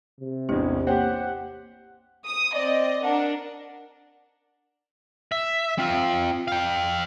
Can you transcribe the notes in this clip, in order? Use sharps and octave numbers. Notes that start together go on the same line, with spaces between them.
C3
A1 E2 D4 G4
A#3 G4 C5 C#5 F#5 G5
D#6
C4 D5 D#5
D4 A#4 F#5
E5
C4 F4
F5 G5